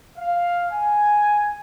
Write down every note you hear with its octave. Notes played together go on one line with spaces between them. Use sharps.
F5
G#5